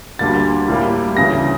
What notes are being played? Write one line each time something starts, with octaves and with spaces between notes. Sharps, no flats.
D2 D3 G3 A#3 A6
A2 G3 A#3
D2 C#3 E3 A#6